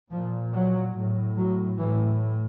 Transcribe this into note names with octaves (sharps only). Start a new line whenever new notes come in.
A#2 F3
F#3
A2
F#3
A2 E3